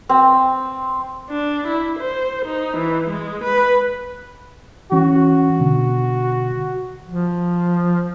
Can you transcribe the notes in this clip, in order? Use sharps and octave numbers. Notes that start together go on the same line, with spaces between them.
C4
D4
E4
C5
D#4
E3
G#3
B4
E3 C#4 F#4
B2 D3
F3